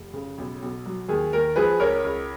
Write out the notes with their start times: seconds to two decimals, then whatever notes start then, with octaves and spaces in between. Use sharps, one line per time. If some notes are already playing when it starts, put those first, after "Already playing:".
Already playing: F1
0.14 C#3
0.38 B1
0.62 B1
0.86 F#3
1.09 D#2 G#4
1.33 D#2 A#4
1.56 F3 G#4 B4
1.79 C#2 A#4 C#5
2.04 C#2